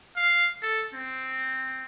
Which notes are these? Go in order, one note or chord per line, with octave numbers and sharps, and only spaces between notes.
F5
A4
C4